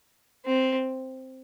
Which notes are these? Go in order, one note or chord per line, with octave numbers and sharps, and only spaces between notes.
C4